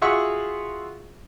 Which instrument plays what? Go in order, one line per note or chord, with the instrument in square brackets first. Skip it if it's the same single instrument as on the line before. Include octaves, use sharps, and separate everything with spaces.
[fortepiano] F4 F#4 G#4 E5 F#5 C#6